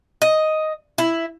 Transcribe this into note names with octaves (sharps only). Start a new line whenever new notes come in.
D#5
E4